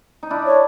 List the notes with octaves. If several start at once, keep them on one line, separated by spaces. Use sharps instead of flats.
D#4
D4 E4
C#5